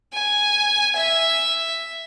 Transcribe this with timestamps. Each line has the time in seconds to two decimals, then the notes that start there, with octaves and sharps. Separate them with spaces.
0.13 G#5
0.96 E5